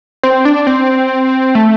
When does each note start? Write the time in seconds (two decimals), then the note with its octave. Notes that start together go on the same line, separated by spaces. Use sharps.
0.23 C4
0.45 D4
0.67 C4
1.55 A3